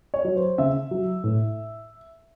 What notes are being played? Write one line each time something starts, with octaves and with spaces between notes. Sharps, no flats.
C#5
F#3
C5
C#3 E5
F#3
A2